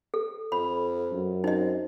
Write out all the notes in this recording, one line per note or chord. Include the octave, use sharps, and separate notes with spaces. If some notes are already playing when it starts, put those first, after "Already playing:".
A4
F2 B5
F#2
C4 D#4 D#5